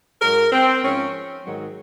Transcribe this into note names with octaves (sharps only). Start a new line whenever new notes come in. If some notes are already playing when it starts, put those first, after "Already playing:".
G#2 F#3 A#4
C4
G#2 F3 C#4
G#2 D#3 F#3